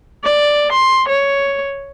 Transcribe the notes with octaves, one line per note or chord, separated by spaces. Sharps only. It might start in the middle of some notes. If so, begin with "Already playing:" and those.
D5
C6
C#5